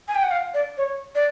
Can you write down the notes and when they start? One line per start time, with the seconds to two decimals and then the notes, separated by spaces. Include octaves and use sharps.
0.08 G#5
0.15 G5
0.23 F#5
0.31 F5
0.54 D5
0.78 C#5
1.15 D5